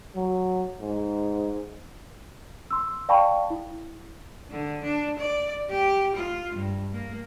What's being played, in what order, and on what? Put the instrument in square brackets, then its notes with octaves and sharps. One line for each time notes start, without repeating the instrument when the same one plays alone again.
[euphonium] F#3
G#2
[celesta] C6 E6
D5 F5 G5 A5 B5 C#6
E4
[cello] D3
D4
D5
G4
F4
G2
A#3